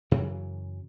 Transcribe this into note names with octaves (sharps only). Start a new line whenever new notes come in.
F#2 C#3 E3 F#3